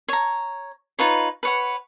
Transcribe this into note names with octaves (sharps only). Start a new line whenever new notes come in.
C#5 A#5
D#4 F4 B4 C#5
B4 C#5 F#5